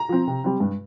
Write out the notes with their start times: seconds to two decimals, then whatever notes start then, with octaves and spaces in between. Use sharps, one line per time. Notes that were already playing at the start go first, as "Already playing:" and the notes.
Already playing: A#5
0.09 F3 C4
0.27 C3
0.44 G3 C4
0.60 G2